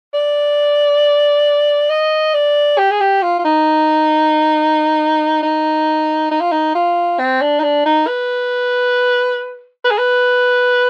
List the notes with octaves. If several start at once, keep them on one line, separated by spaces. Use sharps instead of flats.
D5
D#5
D5
G4
G#4
G4
F4
F4
D#4
D#4
D#4
F4
D#4
F4
C4
D4
D#4
D4
D#4
B4
B4
G#4
B4